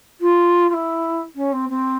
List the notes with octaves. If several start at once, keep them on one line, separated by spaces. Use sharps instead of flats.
F4
F4
E4
C#4
C4
C4